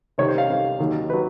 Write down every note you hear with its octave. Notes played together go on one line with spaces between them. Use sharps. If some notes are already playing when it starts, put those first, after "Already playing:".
C2 C3 D#3 G3 C#5
C5
F5
C2 C3 D#3 G3
D#2 D#3 F#3
D#3 F#3 B4